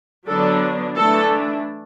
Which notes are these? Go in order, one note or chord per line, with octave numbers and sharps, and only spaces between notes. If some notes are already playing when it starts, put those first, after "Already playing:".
D3 F#3 B3 D4 A4
E3 A3 D4 A4